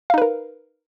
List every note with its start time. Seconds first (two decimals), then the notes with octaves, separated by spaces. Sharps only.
0.10 F5
0.14 D#4
0.18 B4
0.22 A#4